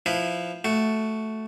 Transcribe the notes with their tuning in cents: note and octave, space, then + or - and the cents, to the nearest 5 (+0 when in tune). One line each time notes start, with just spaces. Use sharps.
F3 +0 E4 +0 B4 +0
A3 -5 F#4 +0